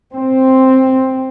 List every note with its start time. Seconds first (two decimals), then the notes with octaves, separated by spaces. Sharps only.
0.13 C4